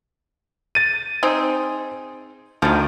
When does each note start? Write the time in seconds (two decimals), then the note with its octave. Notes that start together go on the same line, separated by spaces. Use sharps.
0.75 A6 D#7
1.23 C4 D#4 G#4
2.62 D2 D#3 F3